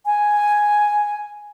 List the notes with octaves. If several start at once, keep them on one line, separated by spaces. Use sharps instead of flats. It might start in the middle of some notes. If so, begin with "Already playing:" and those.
G#5